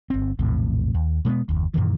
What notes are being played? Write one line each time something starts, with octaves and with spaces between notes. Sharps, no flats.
G1 C4
A#1 E2 A2 C3
D#2
B2 G#3 A3 B3
F#1 D#2
F#2 A#2 D#3 E3